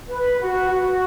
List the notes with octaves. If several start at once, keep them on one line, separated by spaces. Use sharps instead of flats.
B4
F#4
F#4